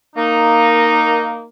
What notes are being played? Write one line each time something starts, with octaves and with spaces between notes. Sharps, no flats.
A#3 D#4